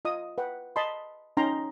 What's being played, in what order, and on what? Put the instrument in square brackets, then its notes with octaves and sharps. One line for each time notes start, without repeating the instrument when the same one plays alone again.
[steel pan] F4 D#5 D#6
B4 F#5 G5
D#5 A5 B5 C6
C#4 D#4 G5 A#5 C6